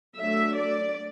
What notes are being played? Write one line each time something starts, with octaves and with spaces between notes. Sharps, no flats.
F#3 A3 D4 E5
D5